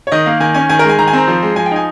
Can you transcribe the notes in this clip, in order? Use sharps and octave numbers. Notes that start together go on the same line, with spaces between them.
C#5
D#3 D#5
A#3 F5
D#3 G#5
C#4 G#5
D#3 G#5
A#4
G#3
G#5
D#3 A#5
G#5
C4 A#5
F3
G#3
F3 G#5
G5
D#4 G#5